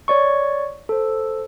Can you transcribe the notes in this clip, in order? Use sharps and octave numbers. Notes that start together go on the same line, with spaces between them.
C#5 D5 C#6
A4 C5